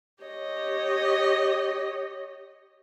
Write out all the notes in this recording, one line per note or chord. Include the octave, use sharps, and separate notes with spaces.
G4 C#5 D#5